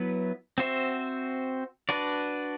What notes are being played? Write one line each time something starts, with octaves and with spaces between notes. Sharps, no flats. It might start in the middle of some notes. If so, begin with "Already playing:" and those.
Already playing: F#3 B3 E4 B4
C4 F#4 C5 E5
D4 F#4 B4 D5